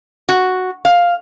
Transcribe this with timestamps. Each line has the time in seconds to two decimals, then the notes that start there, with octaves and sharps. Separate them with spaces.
0.29 F#4
0.85 F5